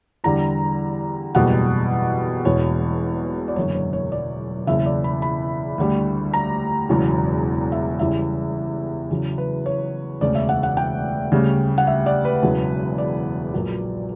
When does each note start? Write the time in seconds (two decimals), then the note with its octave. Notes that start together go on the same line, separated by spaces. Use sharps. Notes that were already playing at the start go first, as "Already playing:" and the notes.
0.24 E2 D3 G3 A#5
1.35 F#1 E2 B2 G3 F#5
2.45 E1 E2 B2 C#5
3.48 D5
3.56 F#1 F#2 D3 C#5
3.75 C#5
3.93 C#5
4.12 D5
4.67 F#1 E2 C#3 E5
4.86 D5
5.04 B5
5.22 B5
5.78 D2 D3 G3
6.34 A#5
6.89 E1 E2 C#3 F#3
7.72 E5
7.99 E2 C#3 E3 G3 E5
9.10 E2 C#3 F#3
9.38 B4
9.66 C#5
10.21 E1 D2 C#3 D5
10.35 E5
10.49 F#5
10.63 F#5
10.77 G5
11.32 D2 C#3 G3
11.78 F#5
11.87 E5
12.06 D5
12.25 B4
12.43 E1 E2 C#3 F#3
12.98 D5
13.54 A#1 A#2 F#3